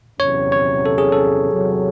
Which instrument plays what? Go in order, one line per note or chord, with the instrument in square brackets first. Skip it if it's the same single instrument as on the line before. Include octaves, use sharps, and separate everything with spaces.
[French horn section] E2 C3 F#3 C#4 [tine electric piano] C#5
[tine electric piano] C#5
A4
G#4
A4
[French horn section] E2 C3 F#3